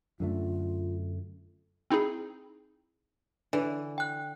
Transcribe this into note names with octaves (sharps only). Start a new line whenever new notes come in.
F#2 D3 A3 F4
C4 D#4 E4 G#4
D3 E3
G5 F#6